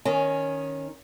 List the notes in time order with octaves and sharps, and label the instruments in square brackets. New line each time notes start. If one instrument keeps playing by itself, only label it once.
[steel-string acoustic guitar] D#3 C#4